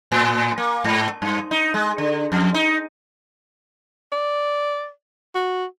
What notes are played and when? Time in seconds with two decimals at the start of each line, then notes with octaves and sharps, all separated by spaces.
0.12 A2
0.58 A#3
0.84 G#2
1.22 G2
1.51 D#4
1.74 G#3
1.98 D3
2.32 F2
2.54 D#4
4.12 D5
5.35 F#4